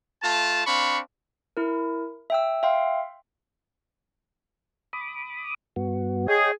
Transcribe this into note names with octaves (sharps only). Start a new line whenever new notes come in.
A3 F4 A5
C4 D4 F5 B5 C#6
E4 A#4
E5 G5 E6
E5 F5 G5 C6
B5 D6 D#6
G2 B3 F#4
G#4 C#5 D#5 G5